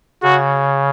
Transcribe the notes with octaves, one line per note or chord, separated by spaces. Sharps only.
C#3 F#4